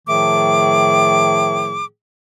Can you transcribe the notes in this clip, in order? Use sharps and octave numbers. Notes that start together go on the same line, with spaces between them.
A2 D#3 F3 A3 G#4 D6